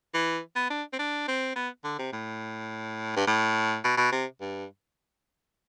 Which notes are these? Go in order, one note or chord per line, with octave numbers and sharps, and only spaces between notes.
E3
B3
D4
C4
D4
C4
B3
D3
C3
A2
G2
A2
B2
B2
C3
G2